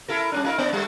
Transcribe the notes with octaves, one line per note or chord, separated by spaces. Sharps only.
E4 A4 A#4
G3 C#4 D4
D#4 F4 A#4
A2 B3 D4
G3 A3 A4